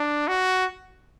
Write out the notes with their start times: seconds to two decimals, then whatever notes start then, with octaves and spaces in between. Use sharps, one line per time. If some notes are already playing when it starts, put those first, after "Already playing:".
Already playing: D4
0.28 F#4